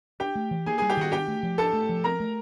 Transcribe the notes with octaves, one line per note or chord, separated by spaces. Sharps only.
D4 G4 G5
A3
E3
A#3 G#4 G#5
G3 G#4 G#5
G4 G5
D#3 F#4 F#5
D4 G4 G5
A3
F3
D4 A4 A5
A3
F3
C4 A#4 A#5
A3